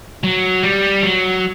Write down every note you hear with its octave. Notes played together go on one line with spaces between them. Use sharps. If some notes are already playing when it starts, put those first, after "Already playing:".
F#3
G3
F#3